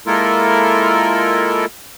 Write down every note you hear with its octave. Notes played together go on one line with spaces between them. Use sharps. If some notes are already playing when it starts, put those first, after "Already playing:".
G#3 A#3 E4 F4 A4 A#4